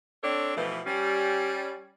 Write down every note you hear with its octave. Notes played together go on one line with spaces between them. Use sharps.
C4 D4 A4 C#5
B2 E3 F3 A3
G3 C#4